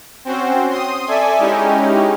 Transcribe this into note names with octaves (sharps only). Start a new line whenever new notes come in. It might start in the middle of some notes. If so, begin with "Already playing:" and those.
C4 C#4 F#4 C5
C6 D#6
A4 D5 E5 G#5
G#3 C#4 D#4 E4 G4